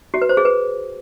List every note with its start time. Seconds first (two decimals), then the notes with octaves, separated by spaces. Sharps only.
0.14 F#4
0.22 B4
0.29 C5
0.37 G#4
0.45 B4